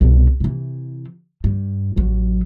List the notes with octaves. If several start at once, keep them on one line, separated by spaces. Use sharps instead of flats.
C2 B2
C3 E3
G2
A1 F#3